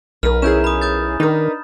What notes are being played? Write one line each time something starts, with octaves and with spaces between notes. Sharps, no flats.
B1 A#4 B4 F6
C#4 E4 G#4 A#5 G6 E7
B5 D#6
D#6 G6 A6
D#3 D4 D#4 A#4 B4